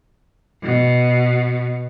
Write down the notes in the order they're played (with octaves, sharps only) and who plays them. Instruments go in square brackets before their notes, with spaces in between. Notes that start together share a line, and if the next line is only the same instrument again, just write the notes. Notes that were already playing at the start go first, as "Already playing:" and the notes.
[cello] B2